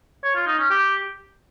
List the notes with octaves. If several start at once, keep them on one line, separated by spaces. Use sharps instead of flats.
C#5
F4
D#4
C#4
G4